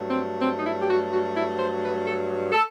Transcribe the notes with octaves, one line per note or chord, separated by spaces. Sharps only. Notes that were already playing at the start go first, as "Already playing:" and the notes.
Already playing: G2 F#3 A3
C4
C4
D#4
E4
G4
F#4
F#4
E4
C5
B4
A4
A4